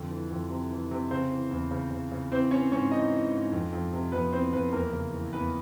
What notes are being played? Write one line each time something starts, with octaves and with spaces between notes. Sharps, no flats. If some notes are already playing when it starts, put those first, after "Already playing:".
Already playing: F2 D3
E3
F2
C3
E3
C3
C#3 C4 C5
E3
E2
C#3
C#3
C#3
E3 C4 C5
E3 C#4 C#5
G#2 C#4 C#5
E3 D#4 D#5
E3
G#2
F2
F2
C3
F2 B3 B4
E3 C4 C5
F2 B3 B4
E2 A#3 A#4
C#3
E3
E2 B3 B4